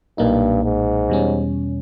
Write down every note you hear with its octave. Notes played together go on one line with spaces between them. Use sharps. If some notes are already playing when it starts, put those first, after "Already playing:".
B1 G2 A#2 A#3 D#4
G#2
E2 B2 G3 C#4